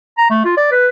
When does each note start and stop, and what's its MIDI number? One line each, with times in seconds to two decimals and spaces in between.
0.18 0.26 82
0.30 0.44 57
0.45 0.53 65
0.57 0.69 74
0.72 0.88 71